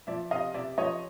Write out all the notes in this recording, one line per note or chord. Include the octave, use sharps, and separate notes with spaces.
F3 D5 E5
C3 D#5 F5
C3 D5 E5
F3 C#5 D#5